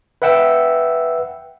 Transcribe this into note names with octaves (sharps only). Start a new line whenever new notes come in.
B4 E5 F#5 G5 E6